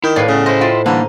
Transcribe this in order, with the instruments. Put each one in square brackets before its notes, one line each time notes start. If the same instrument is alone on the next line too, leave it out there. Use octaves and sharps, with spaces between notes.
[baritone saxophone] D#3 [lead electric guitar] E4
[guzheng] A2 [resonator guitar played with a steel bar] A#3 B4 [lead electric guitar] D5 F5
[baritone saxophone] C#3 [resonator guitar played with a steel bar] A3 B3
[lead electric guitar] E4 D#5 [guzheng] C5
[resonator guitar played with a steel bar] F4 F5 G5
[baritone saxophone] D3 [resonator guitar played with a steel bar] E3 G3 [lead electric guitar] A#3 [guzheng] D#4